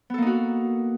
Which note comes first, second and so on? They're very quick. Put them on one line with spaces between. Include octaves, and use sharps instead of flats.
B3 A4 A#3 D#4 F#4